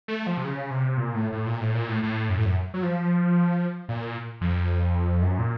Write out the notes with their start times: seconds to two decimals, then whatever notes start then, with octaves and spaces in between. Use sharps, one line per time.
0.08 A3
0.27 F3
0.37 C3
0.44 C#3
0.70 C3
0.97 A#2
1.15 A2
1.32 A2
1.46 A#2
1.61 A2
1.75 A#2
1.88 A2
2.03 A2
2.29 F#2
2.38 A2
2.45 F#2
2.74 F#3
2.83 F3
3.89 A#2
4.41 F2
5.21 F#2
5.39 A#2